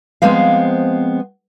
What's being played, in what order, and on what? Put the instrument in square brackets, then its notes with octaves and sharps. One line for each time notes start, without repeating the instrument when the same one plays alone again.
[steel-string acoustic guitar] F3 G#3 B3 C4 F5